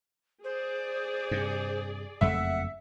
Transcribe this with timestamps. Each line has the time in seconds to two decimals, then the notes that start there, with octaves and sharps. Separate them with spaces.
0.44 G#4 C5 D5
1.31 G2 C3
2.21 F#1 F2 A3 E5 F#5